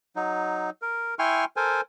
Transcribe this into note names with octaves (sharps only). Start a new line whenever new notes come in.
F#3 D#4
A#4
E4 G5 G#5 C6 C#6 F6
A4 A#4 C5 G#5